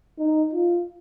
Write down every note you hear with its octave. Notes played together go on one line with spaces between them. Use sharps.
D#4
F4